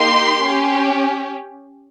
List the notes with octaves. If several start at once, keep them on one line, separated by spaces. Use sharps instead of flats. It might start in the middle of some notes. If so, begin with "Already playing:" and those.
Already playing: A#3 D#4 G4 C6
C#4 G4